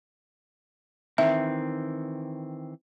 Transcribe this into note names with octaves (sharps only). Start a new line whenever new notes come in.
D#3 E3 C4 E5